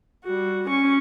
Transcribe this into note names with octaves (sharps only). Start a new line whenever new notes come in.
G3 F#4
C#4 C#6